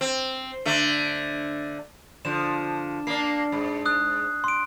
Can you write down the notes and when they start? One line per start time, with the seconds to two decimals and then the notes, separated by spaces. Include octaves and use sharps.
0.01 C4
0.66 D3 A3
2.25 D3 F3 E7
3.07 A#3 D4 C7
3.52 G#2
3.86 D#6 F#6
4.44 C6 D7